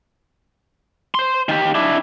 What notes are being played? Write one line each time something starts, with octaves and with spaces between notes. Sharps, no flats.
C5 C6
D#3 G4
D4 E4